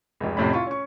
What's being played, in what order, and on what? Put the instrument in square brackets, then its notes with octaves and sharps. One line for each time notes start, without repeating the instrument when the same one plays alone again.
[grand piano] F1 C#2
F1 F2 A2 C3 C#4 B5
E4 F4 C#6
C#4 C#6